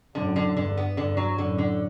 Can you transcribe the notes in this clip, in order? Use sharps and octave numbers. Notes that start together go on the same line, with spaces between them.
F#2 A2 D3
D3
E2 G2 D3
B3
E2 G2 D3
F#3
F#2 A2 D3
D3